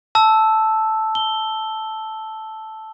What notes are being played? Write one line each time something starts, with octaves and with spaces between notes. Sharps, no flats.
A5 E6
G7